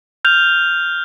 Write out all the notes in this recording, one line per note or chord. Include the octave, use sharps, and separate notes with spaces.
F6 G6 F7